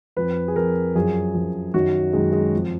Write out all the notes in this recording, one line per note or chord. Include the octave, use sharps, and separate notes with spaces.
F2 F3 B4
G#4
F2 F3 A#4
F#2 F3 G#4
F#2 F3
F#2 D#3 F#3 F#4
F#2 D#3 F#3 G#3
G#3
F2 F3